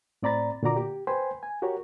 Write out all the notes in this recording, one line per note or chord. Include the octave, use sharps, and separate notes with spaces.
A2 C4 D5 A#5 B5 A6
A#2 D3 F#4 D5 A#5 D6
G4
B4 C5 G5 G#5 B5 C6
G#5
F#4 G4 A#4 C#5